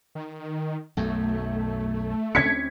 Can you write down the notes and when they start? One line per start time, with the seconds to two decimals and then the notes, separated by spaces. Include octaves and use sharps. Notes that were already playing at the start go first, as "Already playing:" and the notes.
0.15 D#3
0.97 B1 F#2 A3
2.35 D2 C4 C#4 G#6 B6 C#7